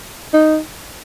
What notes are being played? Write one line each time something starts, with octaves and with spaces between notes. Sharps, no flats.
D#4